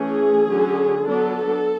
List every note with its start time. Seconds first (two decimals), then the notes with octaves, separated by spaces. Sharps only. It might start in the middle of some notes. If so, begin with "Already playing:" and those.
Already playing: E3 A3 C#4 G#4
0.48 D3 F#3 C#4
1.05 F#3 B3 D4 A4